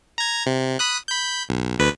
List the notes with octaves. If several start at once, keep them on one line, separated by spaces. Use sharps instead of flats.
A#5 G#6
C3
B5 D#6 F#6
B5 G6
B1
D2 B4